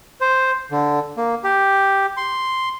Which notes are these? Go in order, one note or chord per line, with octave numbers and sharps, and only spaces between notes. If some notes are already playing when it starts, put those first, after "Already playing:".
C5
D3
A#3
G4
C6